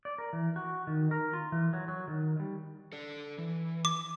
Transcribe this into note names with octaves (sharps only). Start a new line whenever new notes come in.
D5
A#4
E3
F#4
D#3
A#4
F4
E3
F#3
F#3
D#3
G3
A4 D5
E3
D6